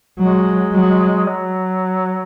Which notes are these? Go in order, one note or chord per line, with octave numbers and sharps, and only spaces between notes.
F#3 G#3
F#3
F#3